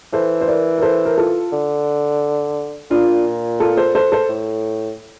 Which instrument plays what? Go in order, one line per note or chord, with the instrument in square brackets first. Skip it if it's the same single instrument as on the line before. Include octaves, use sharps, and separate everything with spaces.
[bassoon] E3 [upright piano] A4 C5
[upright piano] C5
A#4 D5
A#4
A4 C5
A#4
F4 A4
[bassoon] D3
[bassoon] A#2 [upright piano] D4 F4
[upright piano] F4 A4
A4 C5
A4 C5
A4 C5
[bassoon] A2